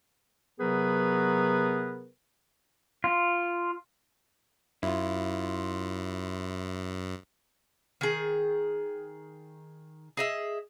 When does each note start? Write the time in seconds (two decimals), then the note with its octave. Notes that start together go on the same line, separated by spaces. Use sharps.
0.60 C3 F#3 B3 G#4 A#4 B4
3.04 F4
4.83 F#2 E4 F4
8.01 D#3 G#4
10.17 G#4 D#5 E5